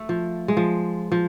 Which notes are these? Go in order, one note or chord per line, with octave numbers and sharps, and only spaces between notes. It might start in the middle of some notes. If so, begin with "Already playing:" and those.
Already playing: A3
F3
G#3
F3
F3